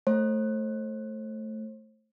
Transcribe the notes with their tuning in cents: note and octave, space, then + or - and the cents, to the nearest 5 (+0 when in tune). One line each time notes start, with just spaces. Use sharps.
A3 +0 C5 +35